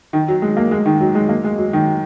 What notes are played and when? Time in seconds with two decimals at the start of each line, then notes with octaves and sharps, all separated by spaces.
0.13 D#3
0.28 F#3
0.42 G#3
0.57 A#3
0.71 G#3
0.86 D#3
1.01 F#3
1.15 G#3
1.29 A#3
1.44 G#3
1.58 F#3
1.73 D#3